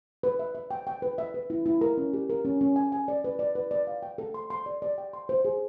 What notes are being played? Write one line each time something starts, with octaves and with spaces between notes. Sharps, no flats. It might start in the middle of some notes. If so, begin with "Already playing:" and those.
B4
E5
E5
G5
G5
B4
E5
B4
E4
E4
A#4
C#4
G4
A#4
C#4
C#4
G#5
G#5
D5
B4
D5
B4
D5
F5
G5
A4
C6
C6
D5
D5
G5
C6
C5
G#4